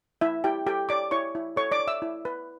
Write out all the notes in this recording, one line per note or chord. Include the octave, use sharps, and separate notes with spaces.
E4 E5
E4 G4 G5
G4 A4 G5
C#5 D5 D6
E4 C#5 C#6
E4
A4 C#5 C#6
D5 D6
C#5
E5 E6
E4
B4